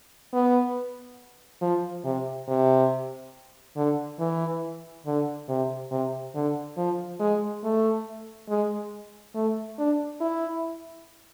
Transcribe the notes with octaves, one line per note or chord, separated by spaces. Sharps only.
B3
F3
C3
C3
D3
E3
D3
C3
C3
D3
F3
G#3
A3
G#3
A3
D4
E4